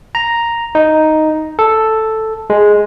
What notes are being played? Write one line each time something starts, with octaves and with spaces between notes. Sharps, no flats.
A#5
D#4
A4
G#3